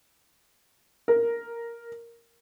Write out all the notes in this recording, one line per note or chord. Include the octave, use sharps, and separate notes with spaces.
A#4